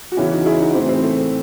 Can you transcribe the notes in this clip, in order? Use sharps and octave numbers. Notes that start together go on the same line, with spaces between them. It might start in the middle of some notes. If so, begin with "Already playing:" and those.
F#4
E2 C#3 E3 C#4 E4
D#4 F#4
E4 G#4
D#4 F#4
A2 E3 C4
C4
A3